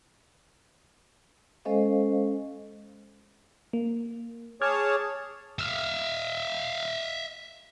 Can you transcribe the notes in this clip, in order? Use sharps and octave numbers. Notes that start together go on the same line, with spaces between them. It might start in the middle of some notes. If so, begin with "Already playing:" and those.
G#3 C#4 A4 C5 D#5 F5
A#3
G#4 C#5 A5 D6 F6 G#6
E5 F5